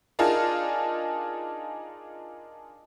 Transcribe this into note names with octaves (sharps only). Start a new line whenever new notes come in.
D4 D#4 F4 G#4 A#4 A5